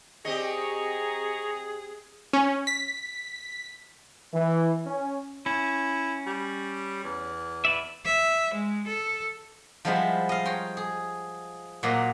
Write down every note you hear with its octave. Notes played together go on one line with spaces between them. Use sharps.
C4 G4 G#4 D#5 A#5 C#6
C#4
B6
E3
C#4
C#4 E4
G3
E2
B4 D5 E5
E5
G#3
A4
F3 G3 G#3 B3 E4 F4
D#5 F5
C#5 G5 A#5 C6
G#4
A#2 F#3 A#3 D5 D#5